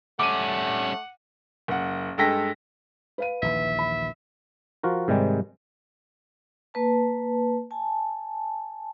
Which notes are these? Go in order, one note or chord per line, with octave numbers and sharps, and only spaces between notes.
G3 A3 C#4 F#5 D6 D#7
F#1 F#5
G2 G#3 A4 G5 A#6 B6
B4 F5 D#7
A#1 D#2 E3 E5
B5
F3 F4 F#4 A#4
G#2 C3 D#3 G3 G#3
A#3 B4 A5
G#5 A5